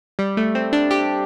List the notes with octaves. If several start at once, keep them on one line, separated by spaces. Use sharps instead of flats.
G3
A3
C4
D4
G4